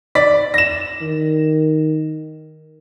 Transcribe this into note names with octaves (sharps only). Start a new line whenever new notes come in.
D5 B6
A#6 E7
D#3